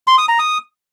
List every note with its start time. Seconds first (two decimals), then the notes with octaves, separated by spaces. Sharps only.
0.07 C6
0.18 D#6
0.28 A#5
0.39 D#6